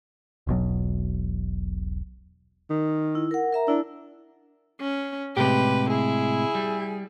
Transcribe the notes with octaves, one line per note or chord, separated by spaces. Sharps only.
E1 B1 B2 F#3
D#3
E4
A#4 F#5
A#4 E5 A#5
D4 E4
C#4
A2 C3 G#3 G4 B4
E4 G#4
G3